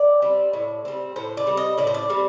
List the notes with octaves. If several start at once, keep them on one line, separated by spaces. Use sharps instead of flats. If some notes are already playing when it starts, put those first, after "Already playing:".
Already playing: D5
G3 C4
A2
G3 C4
A2 C5
D5
G3 C4
D#5
A2 D5
C5
D5
G3 C4